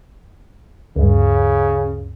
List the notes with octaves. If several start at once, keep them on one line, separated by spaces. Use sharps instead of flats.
D2 G2 C#3